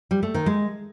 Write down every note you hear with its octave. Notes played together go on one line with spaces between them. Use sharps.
G3
A3
D#3
G#3